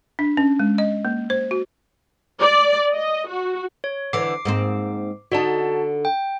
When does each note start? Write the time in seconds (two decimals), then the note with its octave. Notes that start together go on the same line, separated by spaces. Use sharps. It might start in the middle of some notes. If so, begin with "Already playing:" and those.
0.19 D4
0.37 C#4
0.59 G#3
0.78 D#5
1.05 A#3
1.30 C5
1.51 F#4
2.40 D5
2.95 D#5
3.29 F#4
3.84 C#5
4.13 D3 E3 D6 C7
4.45 G#2 A#3 C4
5.32 D3 D#4 F#4 D5 A5
6.05 G5